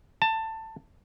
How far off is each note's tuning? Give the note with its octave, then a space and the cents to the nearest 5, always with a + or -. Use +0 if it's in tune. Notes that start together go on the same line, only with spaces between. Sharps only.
A5 +15